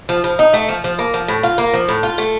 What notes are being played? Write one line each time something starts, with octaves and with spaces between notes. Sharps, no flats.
F3
F3
D#4
A3
F3
F3
A#3
F3
A2
F4
A#3
F3
A2
F4
A3